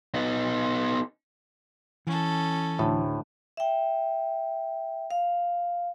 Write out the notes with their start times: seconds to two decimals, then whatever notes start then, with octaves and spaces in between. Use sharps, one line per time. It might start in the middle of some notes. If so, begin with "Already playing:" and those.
0.14 B3 D#4
2.07 E3 C#4 A4
2.79 D2 A2 D3
3.57 E5 G5
5.11 F5